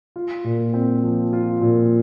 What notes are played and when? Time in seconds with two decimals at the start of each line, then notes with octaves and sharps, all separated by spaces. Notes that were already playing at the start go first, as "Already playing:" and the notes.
0.16 F4
0.44 A#2
0.74 C4
1.03 F3
1.33 F4
1.61 A#2